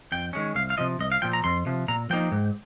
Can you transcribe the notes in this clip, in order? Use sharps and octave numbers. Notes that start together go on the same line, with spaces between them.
F2 G5
D#3 G#3 C#4
C2 F5
F5
C3 F3 D#5
C2 D#5
F5
A#2 F3 G5
A#5
F2 C6
C3 F3
A#2 A#5
F3 A#3 D#4 G5
G#2